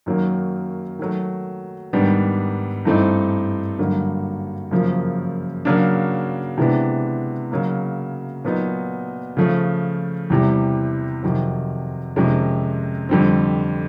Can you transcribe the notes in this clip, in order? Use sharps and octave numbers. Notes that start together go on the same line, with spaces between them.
F#2 D#3 F#3 A#3 C#4
D#3 F#3 A3
G#2 D#3 G3 B3 D4
G2 E3 A3 C4 D#4
G2 D3 F#3 A#3 D#4
F#2 C#3 F3 A#3
C#3 F#3 A#3 D4
C3 E3 G#3 B3 D4
C#3 F#3 A#3 D#4
A#2 F#3 B3 D#4
C#3 F3 A3
E2 C3 E3 G3
F2 C3 D#3 F#3
F2 C3 D#3 G#3 C#4
F2 D3 G3 C4